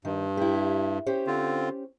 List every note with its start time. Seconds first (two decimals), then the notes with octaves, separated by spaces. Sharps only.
0.05 G2 D#3
0.37 E4 G4
1.06 C#4 G4 C5
1.27 D3 C4 F4